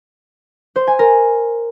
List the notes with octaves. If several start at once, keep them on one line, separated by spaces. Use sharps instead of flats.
C5
G#5
A#4